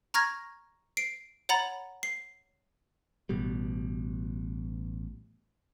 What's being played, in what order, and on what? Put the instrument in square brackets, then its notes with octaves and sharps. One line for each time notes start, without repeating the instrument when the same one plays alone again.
[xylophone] A#5 C#6 F6 G#6 A#6
C7 D7
C#5 F#5 A#5 B5 A6 F#7
C7
[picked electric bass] A1 B2 G3